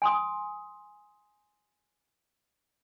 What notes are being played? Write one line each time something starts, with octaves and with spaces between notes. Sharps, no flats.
G#5 C6 D#6